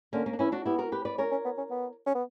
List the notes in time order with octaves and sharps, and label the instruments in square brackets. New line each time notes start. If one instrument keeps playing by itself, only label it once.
[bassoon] D3 [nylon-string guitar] A#3 C#4
[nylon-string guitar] A#3 C#4
D4
[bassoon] E3 [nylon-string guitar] C#4 E4
[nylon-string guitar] D4 F#4
[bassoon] B3 [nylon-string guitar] E4 G4
[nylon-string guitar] F#4 A#4
G4 B4
B4 D5
[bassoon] C#4 [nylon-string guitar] A#4 C#5
[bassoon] C#4
B3
C#4
B3
C#4
B3